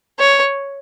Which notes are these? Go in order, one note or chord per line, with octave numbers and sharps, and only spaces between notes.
C#5